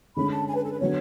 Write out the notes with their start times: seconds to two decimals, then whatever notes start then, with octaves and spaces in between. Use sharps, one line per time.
0.16 D3 G#3 C#4 B5
0.32 A5
0.48 G#5
0.56 B4
0.65 A4
0.72 B4
0.80 D3 F#3 B3 C#5